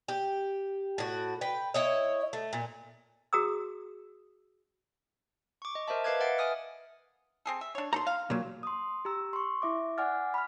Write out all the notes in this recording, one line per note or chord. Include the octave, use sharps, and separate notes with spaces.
G4
A2 F#4
B4 G5
E4 C#5 D#5
A3
A#2
F#4 G#4 A#5 D#6 E6
C#6 D6
D#5
A#4 C5 D#5 E5 A5
B4 D#5 F5 D6 F#6 G#6
B4 E5 F#5 A6 D7
E5 G#5 D#6 F6
C4 G#4 A4
E5
D4 C#5
D#4 A4 A#5 C6
F5
A#2 F#3
C6 D#6
G4 A#5 E6
C6 C#6
E4 E5 D6
D5 F#5 G#5 D6 F6 A6
B5 F6